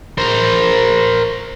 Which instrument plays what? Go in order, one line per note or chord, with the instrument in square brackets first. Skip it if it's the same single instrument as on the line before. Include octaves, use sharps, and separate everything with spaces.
[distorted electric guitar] A#4 C5